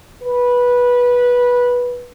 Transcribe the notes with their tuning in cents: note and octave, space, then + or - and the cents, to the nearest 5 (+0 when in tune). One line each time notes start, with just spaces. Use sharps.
B4 -15